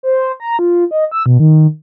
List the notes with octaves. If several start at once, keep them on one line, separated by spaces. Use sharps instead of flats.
C5
A#5
F4
D#5
E6
B2
D#3